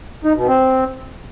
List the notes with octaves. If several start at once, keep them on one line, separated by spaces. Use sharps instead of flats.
D#4
B2
C4